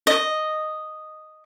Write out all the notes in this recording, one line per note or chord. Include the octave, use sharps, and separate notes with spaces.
D#5